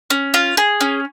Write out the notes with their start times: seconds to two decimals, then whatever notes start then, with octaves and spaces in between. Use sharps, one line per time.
0.10 C#4
0.34 F4
0.57 G#4
0.81 C#4